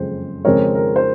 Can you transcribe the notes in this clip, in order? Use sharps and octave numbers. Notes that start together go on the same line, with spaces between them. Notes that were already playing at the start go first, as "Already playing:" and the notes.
Already playing: F#1 F2 C#3 G#3 C4 C5
F2 C#3 F3 G#3 C4 A#4 C#5
A#4
C5